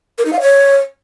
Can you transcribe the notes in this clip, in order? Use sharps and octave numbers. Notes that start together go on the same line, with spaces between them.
A#4
D#4
F5
C#5